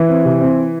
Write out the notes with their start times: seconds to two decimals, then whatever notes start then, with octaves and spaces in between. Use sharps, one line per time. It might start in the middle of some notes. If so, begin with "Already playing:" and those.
Already playing: E3 E4
0.08 C4
0.25 C3
0.41 C4